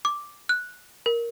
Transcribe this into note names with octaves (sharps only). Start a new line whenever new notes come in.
D6
F#6
A#4